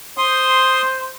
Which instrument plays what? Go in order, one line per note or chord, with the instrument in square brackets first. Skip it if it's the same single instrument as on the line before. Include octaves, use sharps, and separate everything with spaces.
[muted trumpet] C5 [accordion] C6 D#6